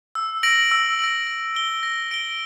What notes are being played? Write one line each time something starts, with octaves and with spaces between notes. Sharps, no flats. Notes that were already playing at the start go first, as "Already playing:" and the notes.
E6
A#6 D7 F#7
E6
A#6 D7 F#7
A#6
D7 G7
A#6
D7 G7